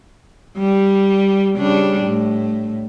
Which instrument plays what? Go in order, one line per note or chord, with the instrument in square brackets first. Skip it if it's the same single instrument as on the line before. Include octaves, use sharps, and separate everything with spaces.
[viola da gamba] G3
C#3 G3 D4
A2